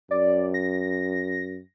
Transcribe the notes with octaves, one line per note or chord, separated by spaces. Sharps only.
F#2 D5
A#6